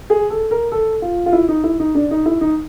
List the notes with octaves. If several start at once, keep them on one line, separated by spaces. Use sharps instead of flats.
G#4
A4
A#4
A4
F4
F4
E4
D#4
E4
D#4
D4
D#4
E4
D#4